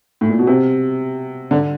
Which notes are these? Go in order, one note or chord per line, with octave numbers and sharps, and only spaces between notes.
A2
A#2
B2
C3
D3